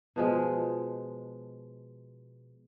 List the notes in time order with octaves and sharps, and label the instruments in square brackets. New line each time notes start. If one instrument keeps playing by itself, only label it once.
[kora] B2 F3 G#3